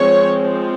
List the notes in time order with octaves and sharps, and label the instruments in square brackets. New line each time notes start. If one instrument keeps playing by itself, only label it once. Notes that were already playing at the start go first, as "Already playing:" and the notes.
Already playing: [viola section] F3 G#3 C4 C#5